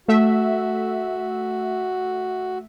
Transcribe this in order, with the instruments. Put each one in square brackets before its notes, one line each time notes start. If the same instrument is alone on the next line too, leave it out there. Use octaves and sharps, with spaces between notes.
[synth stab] A3 E5 [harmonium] F#4